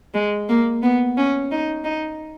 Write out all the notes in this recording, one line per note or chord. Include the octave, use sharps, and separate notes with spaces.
G#3
A#3
B3
C#4
D#4
D#4